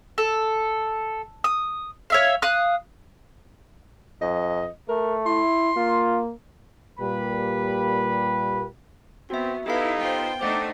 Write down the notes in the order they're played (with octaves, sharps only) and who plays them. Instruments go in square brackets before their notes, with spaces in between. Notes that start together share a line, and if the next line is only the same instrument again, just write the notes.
[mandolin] A4
D#6
C#5 E5 F5
F5 D#6 F#6
[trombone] F2 [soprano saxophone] D#5
[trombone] A3 [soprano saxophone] A#4
[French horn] E4 [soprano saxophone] C6
[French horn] A#3 [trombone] F4
[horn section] A#2 G3 A#3 G4 B4 B5
[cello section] B3 [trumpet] C4 [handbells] F#4 E5
[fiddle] B3 [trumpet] D#4 [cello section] E4 [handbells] G4 A4 F5
[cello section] B3 F4 C5 [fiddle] G5
[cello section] A3 D4 D#4 [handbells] C5 F#5 [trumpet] D6